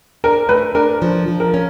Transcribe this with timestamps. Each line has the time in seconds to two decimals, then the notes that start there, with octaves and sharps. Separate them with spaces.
0.24 D4 A#4
0.49 A3 B4
0.75 D4 A#4
1.02 F3
1.28 F3
1.40 A#4
1.54 C#4